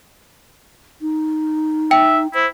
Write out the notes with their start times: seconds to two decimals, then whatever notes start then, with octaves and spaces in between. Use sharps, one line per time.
1.02 D#4
1.91 E5 G5
2.34 E4 C5